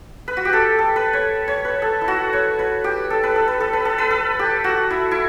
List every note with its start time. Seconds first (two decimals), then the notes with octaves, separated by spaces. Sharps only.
0.28 B4
0.37 F#4
0.45 G4
0.53 A4
0.78 A4
0.96 B4
1.13 C#5
1.48 C#5
1.65 B4
1.82 A4
2.01 E4
2.08 F#4
2.33 C#5
2.59 B4
2.84 G4
3.10 A4
3.23 B4
3.36 A4
3.48 B4
3.60 A4
3.73 B4
3.85 A4
3.98 B4
4.11 A4
4.39 G4
4.64 F#4
4.90 E4
5.11 E4